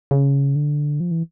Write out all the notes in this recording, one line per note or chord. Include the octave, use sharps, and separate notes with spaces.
C#3
D3
F3
E3